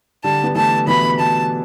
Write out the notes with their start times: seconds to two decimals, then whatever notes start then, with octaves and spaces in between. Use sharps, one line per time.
0.24 D3 G3 A5
0.44 B3
0.55 E3 A3 A5
0.87 B2 E3 B5
1.19 B2 A5